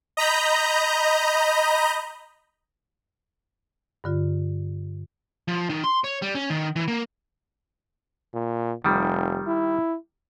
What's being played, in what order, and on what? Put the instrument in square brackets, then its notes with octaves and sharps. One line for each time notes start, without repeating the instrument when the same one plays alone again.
[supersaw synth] D#5 A#5 B5 G6
[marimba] G2 D3 F4
[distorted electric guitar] F3
D#3
C6
C#5
G3
C#4
D#3
E3
A#3
[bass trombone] A#2
[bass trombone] F1 [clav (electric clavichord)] D#3 G3
[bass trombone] E4